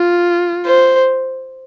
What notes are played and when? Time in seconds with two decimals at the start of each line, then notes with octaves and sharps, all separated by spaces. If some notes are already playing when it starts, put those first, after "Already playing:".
Already playing: F4
0.66 C5